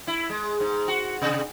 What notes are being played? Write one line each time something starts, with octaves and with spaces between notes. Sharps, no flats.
E4
G#3
G#2
F#4
C3